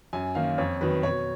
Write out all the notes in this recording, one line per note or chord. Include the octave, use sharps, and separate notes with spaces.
F#2 G#5
D#3 A#3 C#4 F5
F2 C#5
D#3 F#3 B4
B2 C#5